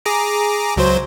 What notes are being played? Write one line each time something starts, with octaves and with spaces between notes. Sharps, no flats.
G#4 A#5 D6
C#2 F#3 C5